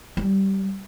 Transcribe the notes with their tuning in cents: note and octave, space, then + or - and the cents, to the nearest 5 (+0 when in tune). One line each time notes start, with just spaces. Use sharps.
G3 -15